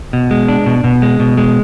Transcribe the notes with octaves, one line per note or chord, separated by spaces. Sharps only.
B2
G#3
D4
B2
B2
G#3
B2
G#3